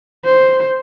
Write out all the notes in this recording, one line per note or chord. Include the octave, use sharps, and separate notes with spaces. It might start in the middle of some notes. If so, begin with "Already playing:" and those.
C5